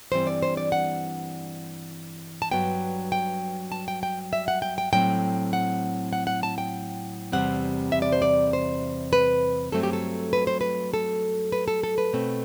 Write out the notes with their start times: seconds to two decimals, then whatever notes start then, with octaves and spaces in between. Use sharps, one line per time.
0.12 G2 E3 G3 C4 C5
0.27 D5
0.42 C5
0.57 D5
0.72 F#5
2.42 A5
2.51 G2 F#3 B3 G5
3.12 G5
3.72 A5
3.88 G5
4.03 G5
4.33 E5
4.48 F#5
4.62 G5
4.78 G5
4.93 A2 F#3 C4 G5
5.53 F#5
6.13 F#5
6.27 F#5
6.43 A5
6.58 G5
7.32 E2 C3 G3 C4 F#5
7.92 E5
8.02 D5
8.12 C5
8.22 D5
8.53 C5
9.13 B4
9.72 G2 F#3 A3 C4 A4
9.83 G4
9.93 A4
10.33 B4
10.47 C5
10.61 B4
10.94 A4
11.52 B4
11.68 A4
11.83 A4
11.98 B4
12.13 B2 A3 C4